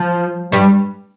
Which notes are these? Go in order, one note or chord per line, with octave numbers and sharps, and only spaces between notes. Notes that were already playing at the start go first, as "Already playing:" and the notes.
Already playing: F3
G2 G3